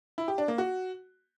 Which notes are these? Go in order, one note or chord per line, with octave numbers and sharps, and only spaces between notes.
E4
G4
D4
A#3
F#4